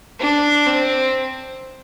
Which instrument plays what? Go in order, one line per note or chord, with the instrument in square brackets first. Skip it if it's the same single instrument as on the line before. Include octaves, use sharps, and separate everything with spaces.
[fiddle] D4
C4